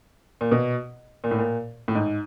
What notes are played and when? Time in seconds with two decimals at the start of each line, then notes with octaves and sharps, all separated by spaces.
0.41 A#2
0.52 B2
1.24 A#2
1.31 A2
1.39 A#2
1.88 A2
1.95 G#2